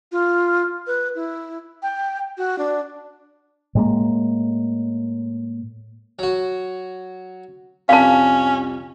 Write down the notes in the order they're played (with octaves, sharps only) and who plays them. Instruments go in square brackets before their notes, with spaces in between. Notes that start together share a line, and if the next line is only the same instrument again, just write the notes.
[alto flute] F4
B4
E4
G5
F#4
D4
[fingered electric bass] A2 G#3 A#3
[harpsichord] F#3 F#4
[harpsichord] C2 F2 [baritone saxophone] C#4 [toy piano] F5 A5